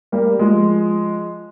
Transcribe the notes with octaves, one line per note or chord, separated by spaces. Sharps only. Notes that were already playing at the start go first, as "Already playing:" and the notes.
G3 A#3
F3 G#3